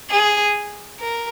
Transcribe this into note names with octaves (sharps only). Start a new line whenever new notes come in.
G#4
A#4